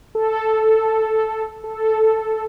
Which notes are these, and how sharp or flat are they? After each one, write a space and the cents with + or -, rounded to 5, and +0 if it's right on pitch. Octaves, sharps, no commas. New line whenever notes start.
A4 -5
A4 -5